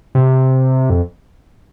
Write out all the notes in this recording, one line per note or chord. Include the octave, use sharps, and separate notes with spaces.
C3
F2